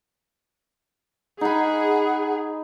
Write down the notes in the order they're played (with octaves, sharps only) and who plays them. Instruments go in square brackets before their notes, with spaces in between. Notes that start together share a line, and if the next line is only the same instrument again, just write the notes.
[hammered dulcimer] D#4 B5 [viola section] G#4 [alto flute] F#5